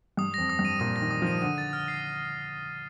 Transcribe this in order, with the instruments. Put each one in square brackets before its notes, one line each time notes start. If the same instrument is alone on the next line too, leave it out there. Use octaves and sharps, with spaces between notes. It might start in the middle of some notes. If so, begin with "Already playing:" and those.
[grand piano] G2 [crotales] D#6
[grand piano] F2 [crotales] A#6
[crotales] D#6
[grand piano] G2
[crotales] D#7
[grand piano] A#2 [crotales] D#6
[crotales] A#6
[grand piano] D#3
[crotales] D#6
[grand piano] F3
[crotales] D#7
[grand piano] D3 [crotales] D#7
[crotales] A6
F6
C7